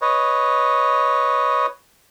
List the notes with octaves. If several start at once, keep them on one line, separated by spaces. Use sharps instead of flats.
B4 C#5 D#5